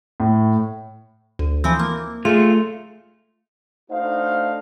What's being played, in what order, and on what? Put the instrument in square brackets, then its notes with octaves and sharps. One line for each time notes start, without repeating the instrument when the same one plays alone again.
[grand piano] A2
[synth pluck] D2
E3 F3 C4
A#3
[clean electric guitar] A3 F4 [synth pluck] G#4
[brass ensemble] A3 D4 D#4 F#4 C5 F5